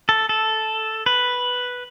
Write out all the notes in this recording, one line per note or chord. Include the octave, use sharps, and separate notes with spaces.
A4
A4
B4